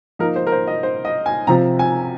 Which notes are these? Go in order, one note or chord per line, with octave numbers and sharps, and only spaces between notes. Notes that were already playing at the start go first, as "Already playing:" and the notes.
F3 A#3 D#4 A#4
C5
A#4
C5
D#5
C5
D#5
G#5
C3 F3 C4 A#5
G#5